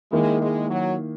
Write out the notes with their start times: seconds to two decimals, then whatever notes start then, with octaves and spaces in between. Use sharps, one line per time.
0.12 D#3 G#3 A#3 E4
0.41 G#3
0.69 F#3